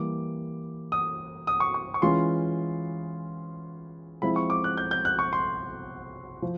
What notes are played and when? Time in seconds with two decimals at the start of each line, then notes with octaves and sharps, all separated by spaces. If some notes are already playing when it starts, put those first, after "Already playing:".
Already playing: E3 G3 A#3 D6
0.92 D#6
1.47 D#6
1.60 C#6
1.74 C#6
1.94 C#6
2.02 E3 G#3 C#4 F4 C6
4.22 F3 G#3 C4 E4 B5
4.36 C#6
4.50 D6
4.64 F#6
4.77 G6
4.91 G6
5.05 F#6
5.19 C#6
5.33 C6
6.42 F3